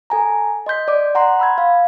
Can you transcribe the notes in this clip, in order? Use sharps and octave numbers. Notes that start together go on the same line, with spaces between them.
A4 G#5 A#5
D#5 C6 G6 B6
D5 D6
F#5 A#5 C6
B5 E6 G#6
F5